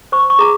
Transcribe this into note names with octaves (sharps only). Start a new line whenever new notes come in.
C5 C#6
C#6
G#4 A#5